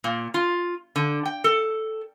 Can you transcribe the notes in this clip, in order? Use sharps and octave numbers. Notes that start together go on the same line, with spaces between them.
A#2
F4
D3
G5
A4